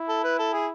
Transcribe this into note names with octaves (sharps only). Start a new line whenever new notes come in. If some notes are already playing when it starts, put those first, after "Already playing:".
Already playing: E4
A4
B4
A4
G#4